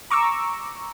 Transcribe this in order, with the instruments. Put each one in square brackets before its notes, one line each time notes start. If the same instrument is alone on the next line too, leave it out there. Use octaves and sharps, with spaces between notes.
[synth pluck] A#5 C#6 D6 E6